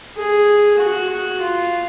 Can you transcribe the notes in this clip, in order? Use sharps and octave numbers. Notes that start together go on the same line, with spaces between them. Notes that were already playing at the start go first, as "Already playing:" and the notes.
G#4
F#4
F#4
F4